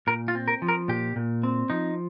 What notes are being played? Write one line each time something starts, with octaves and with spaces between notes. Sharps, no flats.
A#2 A#4
F4
C4
A#4
F3
A#4
A#2 G4
A#2
C4
F3 D#4